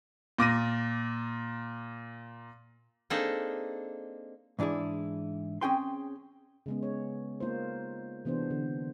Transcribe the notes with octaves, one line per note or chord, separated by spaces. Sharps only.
A#2 D6 A#6 D#7
A#3 C4 D4 D#4 G#4 A4
G#2 E3 D4 E4 G#4
C4 C#4 G#4 G5 G#5 C6
C#3 G#3 B3
C#5
A#3 D#4 F4 C5
C3 E3 B3 D4 C5
D3